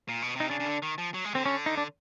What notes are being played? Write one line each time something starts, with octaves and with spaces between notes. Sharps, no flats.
A#2
B2
C3 D#4
C#3 D4
C#3
D3
D#3
F3
F#3
G#3
D3 C4
C#4
D#4
D4